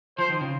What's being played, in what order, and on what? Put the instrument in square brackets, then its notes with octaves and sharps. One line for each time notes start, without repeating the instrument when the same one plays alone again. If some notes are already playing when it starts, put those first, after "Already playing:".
[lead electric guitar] F3 [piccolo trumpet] C5
[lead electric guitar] D#3
C#3